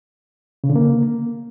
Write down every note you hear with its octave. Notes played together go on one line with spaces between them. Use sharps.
C#3
D3
A#3